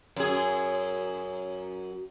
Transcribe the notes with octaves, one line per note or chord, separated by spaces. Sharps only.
F#2 G#4